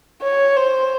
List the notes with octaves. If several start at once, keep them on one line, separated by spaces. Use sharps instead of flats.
C#5
C5